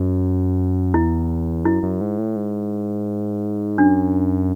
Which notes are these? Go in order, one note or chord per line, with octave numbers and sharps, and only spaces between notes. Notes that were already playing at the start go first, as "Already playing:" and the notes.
Already playing: F#2
E2 E4
F#2 E4
F#2
G#2
A2
G#2
F#2 D4